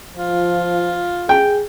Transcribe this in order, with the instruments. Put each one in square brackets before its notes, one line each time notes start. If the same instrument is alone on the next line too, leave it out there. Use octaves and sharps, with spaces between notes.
[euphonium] F3 [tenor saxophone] F4
[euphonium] G#4 [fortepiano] G5